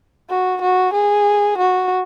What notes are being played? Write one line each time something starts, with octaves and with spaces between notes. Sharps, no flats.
F#4
F#4
G#4
F#4